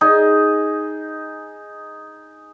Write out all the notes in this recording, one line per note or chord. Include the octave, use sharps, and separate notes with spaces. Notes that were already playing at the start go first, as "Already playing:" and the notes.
D#4 G#4